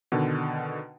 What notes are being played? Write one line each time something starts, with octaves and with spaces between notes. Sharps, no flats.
B2 D3 D#3